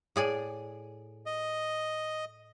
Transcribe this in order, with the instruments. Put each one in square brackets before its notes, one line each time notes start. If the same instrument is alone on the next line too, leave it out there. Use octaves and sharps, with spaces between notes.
[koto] A2 G#4 D5
[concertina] D#5